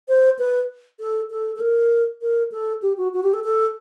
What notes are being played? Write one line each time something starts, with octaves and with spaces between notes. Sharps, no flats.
C5
B4
A4
A4
A4
A#4
A#4
A4
G4
F#4
F#4
G4
A4
A4